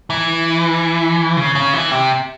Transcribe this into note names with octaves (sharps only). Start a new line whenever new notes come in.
E3
C#3
C#3
E3
C3